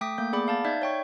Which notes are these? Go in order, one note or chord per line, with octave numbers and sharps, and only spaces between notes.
A3 G5 D6 D#6 B6
A3 A#3 G6
B3 G#4 D5 B5 D6
F5 A5 A6
D#4 D5 E5 G6 G#6
C#5 G5 C#6